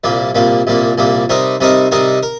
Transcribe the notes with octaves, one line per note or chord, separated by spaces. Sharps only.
C2 A#2 G3 A#3
C2 A#2 G3 A#3
C2 A#2 G3 A#3
C2 A#2 G3 A#3
C3 G3 C4 D#4 A#4
C3 G3 C4 D#4 A#4
C3 G3 C4 D#4 A#4
A#4